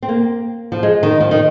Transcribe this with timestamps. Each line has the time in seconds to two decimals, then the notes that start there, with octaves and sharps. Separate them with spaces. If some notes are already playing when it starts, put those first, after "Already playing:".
0.02 C4
0.09 A#3
0.72 F3
0.83 G#3
1.03 D#3
1.20 F3
1.31 D#3